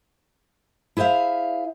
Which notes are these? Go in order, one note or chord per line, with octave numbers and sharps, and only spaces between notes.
E4 G#4 C5 E5 F5